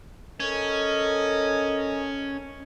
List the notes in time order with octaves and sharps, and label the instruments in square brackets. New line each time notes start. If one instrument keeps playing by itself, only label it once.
[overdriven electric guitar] C#4 [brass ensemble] A4 A#4 D#5